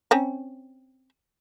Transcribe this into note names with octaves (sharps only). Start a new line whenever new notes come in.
C4 C#4 A#5